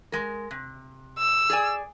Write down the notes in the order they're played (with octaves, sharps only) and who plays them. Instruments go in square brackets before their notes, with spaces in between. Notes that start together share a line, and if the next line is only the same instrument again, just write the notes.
[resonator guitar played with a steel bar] G#3 A#4
C3
[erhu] E6
[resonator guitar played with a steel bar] G#4 D5 G#5